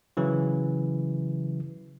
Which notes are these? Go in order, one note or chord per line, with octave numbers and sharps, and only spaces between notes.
C#3 E3 F#3